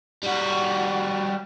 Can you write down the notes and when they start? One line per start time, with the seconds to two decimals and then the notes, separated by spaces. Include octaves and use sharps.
0.23 G3 F#4